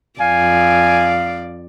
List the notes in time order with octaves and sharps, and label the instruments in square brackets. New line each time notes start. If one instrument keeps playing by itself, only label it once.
[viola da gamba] F2 D5 [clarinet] F5 [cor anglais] G#5